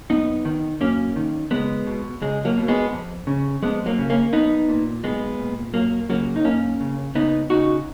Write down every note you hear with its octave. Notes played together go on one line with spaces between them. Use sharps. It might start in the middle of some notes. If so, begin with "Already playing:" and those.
F#2 B3 D#4
D#3
F#2 A#3 C#4
D#3
C#2 G#3 B3
B2
C#2 G#3
F#3 A#3
B2
G#3 B3
F2
C#3
F2 G#3 B3
F#3 A#3
C#3
A#3 C#4
B1 B3 D#4
A#2
B1 G#3 B3
A#2
F#2 F#3 A#3
C#3 F#3 A#3
D#4
F#2 A#3 C#4
C#3
C#2 B3 D#4
C#3 D#4 F#4